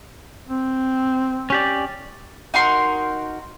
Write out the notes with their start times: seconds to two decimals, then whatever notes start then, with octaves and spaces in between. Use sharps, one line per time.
0.48 C4
1.50 C#4 G4 D5
2.54 D#4 F#4 A#4 C6